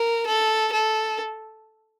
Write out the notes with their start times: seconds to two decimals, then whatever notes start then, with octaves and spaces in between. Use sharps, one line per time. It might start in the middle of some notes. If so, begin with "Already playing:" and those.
Already playing: A#4
0.27 A4
0.72 A4